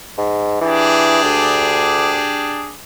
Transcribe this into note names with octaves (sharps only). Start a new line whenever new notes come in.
G#2
E3 D4 G4 G#4
D2